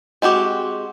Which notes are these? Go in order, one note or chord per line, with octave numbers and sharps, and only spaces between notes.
G#3 C4 F#4 G4